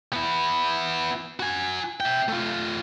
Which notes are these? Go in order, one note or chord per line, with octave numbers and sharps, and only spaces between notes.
B3 E4
F#4 G#5
E5 G5
A3 F4